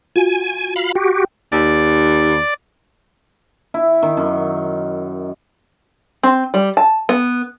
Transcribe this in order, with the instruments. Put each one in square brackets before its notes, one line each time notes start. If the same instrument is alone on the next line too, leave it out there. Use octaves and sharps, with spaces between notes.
[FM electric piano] F4 F#4 [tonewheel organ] G#5
[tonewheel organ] F5 B5
[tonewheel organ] F#4 G4 [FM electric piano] G5
[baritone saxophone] D#2 [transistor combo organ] D5
[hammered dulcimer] E4
D#3
F#2
[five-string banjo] C4
G3
A5
B3